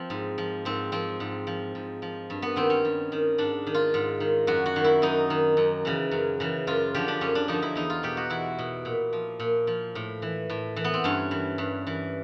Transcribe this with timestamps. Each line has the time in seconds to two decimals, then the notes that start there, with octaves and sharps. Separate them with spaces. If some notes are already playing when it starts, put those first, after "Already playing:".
Already playing: F3 C4
0.10 G#2
0.38 F3
0.65 G#2 C4
0.92 F3 C4
1.20 G#2
1.47 F3
1.75 G#2
2.02 F3
2.30 G2
2.42 B3
2.56 D#3 C4
2.70 C#4
2.85 G2
3.12 D#3
3.38 G#2 D4
3.67 D#3
3.75 F4
3.94 G#2
4.20 D#3
4.47 F#2 F#4
4.66 F#4
4.76 D#3
4.84 E4
5.02 F#2 D#4
5.30 D#3
5.57 F#2
5.85 C#3 E3
6.11 F#2
6.40 C#3 E3
6.67 F#2 F4
6.94 D3 F3 G4
7.08 D4
7.21 F#2 C#4
7.35 D4
7.48 D3 F3 D#4
7.62 E4
7.75 E2 D#4
7.90 F4
8.03 B2 G4
8.17 F#4
8.30 E2 E4
8.59 B2
8.85 A#2
9.13 F3
9.40 A#2
9.67 F3
9.95 A2
10.22 E3
10.50 A2
10.76 E3
10.84 B3
10.94 C4
11.04 G2 C#4
11.31 E3
11.58 G2
11.87 E3